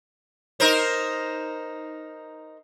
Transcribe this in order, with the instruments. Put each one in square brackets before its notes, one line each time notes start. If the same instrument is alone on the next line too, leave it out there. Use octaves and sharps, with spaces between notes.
[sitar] D#4 A#4 C5